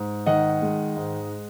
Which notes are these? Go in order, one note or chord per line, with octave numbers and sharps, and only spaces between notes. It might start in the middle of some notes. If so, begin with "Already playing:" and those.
Already playing: G#2
D#3 D#5 F#5
G#3
G#2